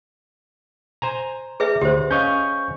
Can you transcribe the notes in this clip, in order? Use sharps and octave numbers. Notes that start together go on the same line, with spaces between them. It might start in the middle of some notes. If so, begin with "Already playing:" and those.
C5 G#5 A#5
G#4 B4 E5
D2 G4 C5
C#4 D#5 F5 C#6 G6